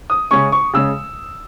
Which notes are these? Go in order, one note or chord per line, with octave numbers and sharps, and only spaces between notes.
D#6
C#3 G#3 C#4 C#6
C#6
C#3 G#3 C#4 E6